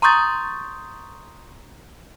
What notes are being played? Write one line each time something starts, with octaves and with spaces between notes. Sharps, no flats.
A#5 C6 C#6 D#6 G6 A6